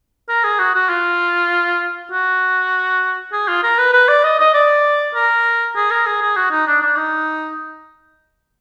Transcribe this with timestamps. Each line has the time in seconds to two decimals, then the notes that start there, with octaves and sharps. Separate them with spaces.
0.29 A#4
0.44 G#4
0.59 F#4
0.75 F#4
0.89 F4
2.12 F#4
3.33 G#4
3.48 F4
3.63 A#4
3.78 B4
3.93 B4
4.09 D5
4.24 D#5
4.39 D#5
4.54 D5
5.15 A#4
5.76 G#4
5.91 A#4
6.06 G#4
6.22 G#4
6.37 F#4
6.51 D#4
6.67 D4
6.82 D4
6.97 D#4